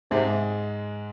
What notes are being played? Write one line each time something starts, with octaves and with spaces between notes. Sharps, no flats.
G#2 C3 G#3